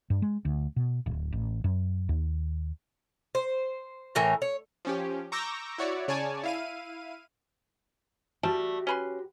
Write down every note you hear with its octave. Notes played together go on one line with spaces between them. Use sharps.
G2
G#3
D2
B2
D1
A1
F#2
D#2
C5
A2 E3 A#4 C#5
C#5
F3 C#4 G4
A#5 C#6 D6 E6 G6 A#6
E4 F#4 C#5 D5
C#3 C#5 D5 G#5 A5
E4 F5 D#7
G3 A3 F#4 G4 A5
C#4 B4 C6